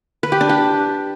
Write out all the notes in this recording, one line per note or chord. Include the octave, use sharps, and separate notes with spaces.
B4
G4
D4
G4